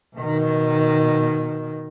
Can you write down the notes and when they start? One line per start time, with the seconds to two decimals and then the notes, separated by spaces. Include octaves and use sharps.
0.16 B2 D#3